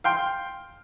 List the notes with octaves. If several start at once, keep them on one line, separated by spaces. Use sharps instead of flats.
F5 G5 C6